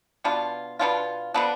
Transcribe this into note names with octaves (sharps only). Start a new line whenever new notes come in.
B2 B3 D4 F4
B2 B3 D4 F4
D3 F3 B3 D4